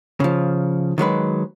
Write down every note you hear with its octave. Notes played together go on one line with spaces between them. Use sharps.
C#3 F3
D#3 F#3 G#3 B4